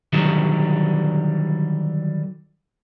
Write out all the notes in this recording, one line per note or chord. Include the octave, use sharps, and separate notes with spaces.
D3 D#3 F#3 G3